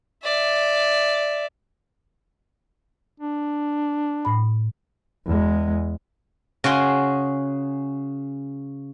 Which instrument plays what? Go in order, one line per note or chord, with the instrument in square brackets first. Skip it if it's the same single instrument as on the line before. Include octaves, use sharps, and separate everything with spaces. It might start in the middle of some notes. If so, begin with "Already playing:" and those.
[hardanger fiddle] D5 E5
[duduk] D4
[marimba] A2 B5
[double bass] E2 G#3
[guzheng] C#3 F#4 G#4 C6